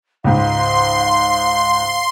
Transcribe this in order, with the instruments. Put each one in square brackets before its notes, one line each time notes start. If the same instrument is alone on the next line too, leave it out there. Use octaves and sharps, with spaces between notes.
[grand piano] C#2 G#2 [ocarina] F5 [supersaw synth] C6